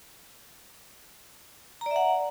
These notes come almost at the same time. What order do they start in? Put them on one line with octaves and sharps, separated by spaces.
A#5 D5 E5 F#5